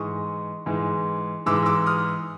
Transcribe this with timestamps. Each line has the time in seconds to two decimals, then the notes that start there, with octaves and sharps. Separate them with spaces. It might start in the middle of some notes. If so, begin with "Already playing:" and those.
Already playing: G#2 E3 G#3 C#6 D#6
0.66 G#2 E3 G#3
1.46 G#2 E3 G#3 D6 E6
1.66 D6 E6
1.86 D#6 F6